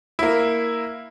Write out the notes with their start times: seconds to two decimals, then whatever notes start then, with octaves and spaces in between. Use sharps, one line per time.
0.19 A#3 E4